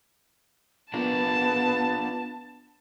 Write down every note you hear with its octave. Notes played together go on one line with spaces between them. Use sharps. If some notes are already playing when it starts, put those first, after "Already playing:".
B3 D4 F4 A#4 A5